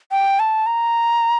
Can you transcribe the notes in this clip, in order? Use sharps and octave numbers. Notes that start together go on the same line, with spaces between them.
G5
A5
A#5